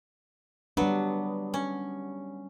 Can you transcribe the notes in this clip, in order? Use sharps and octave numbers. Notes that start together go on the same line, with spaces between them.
F#3 G3 B3 D4
C#4